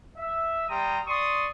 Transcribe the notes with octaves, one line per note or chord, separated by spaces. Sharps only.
E5
G3 G5 A#5 C6 D#6
D5 C6 C#6 D#6